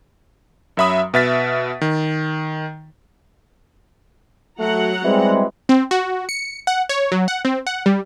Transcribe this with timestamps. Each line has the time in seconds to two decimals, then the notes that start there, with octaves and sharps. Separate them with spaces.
0.77 F#2 F#3 E5 B5 D#6
1.14 B2 B4 E5 F6 A6 B6
1.81 D#3
4.59 F#3 A3 F#5 A#5
5.04 E3 G3 G#3 C4
5.69 C4
5.91 F#4
6.29 C#7
6.67 F#5
6.89 C#5
7.12 F#3
7.28 F#5
7.45 C4
7.67 F#5
7.86 G3